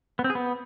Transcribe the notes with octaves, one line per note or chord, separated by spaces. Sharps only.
B3
C4
G#4
B3